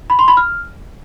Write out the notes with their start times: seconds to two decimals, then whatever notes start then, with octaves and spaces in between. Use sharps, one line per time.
0.10 B5
0.19 C6
0.28 B5
0.37 F6